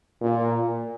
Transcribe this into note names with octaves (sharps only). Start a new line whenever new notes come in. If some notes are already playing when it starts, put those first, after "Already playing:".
A#2